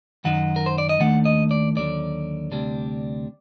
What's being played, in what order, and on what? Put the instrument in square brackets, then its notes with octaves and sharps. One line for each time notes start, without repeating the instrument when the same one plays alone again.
[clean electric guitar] F#2 D#3 F#3 D#4 F#5
A#4
C5
D5
D#5
D#2 D#3 A3 D4 F#5
D#5
D5
D#2 D3 F#3 D5
D2 C3 G3 D4